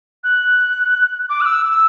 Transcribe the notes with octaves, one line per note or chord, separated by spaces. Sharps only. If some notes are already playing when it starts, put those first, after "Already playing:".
F#6
D6
F#6
E6
E6